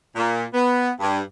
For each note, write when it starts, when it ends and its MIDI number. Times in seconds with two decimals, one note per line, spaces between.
0.16 0.44 46
0.54 0.91 59
1.00 1.20 43